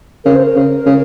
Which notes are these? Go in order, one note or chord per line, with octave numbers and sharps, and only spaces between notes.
C#3 A#4
C5
A#4
C#3
C#3